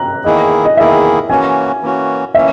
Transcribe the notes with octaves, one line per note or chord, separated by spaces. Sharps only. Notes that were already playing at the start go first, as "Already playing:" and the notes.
Already playing: A#5 F#6
E2 D#3 A#3 E4 G#4 D#5
D#5
E2 D#3 A#3 E4 G#4 E5
E3 A#3 C#4 F#4 G#5
E3 A#3 C#4 F#4
E3 A#3 C#4 E5